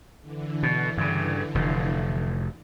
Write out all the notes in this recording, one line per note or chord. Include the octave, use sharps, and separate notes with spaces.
D3 E3
B2
G2 C#3
F1 A2